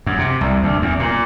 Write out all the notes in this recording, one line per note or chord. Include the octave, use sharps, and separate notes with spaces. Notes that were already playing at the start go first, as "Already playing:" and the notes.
F#2
C3
C2
D2
E2
A#2